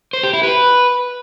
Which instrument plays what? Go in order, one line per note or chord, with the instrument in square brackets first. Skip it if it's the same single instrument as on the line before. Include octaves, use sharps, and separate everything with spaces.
[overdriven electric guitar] C5
G4
E4
B4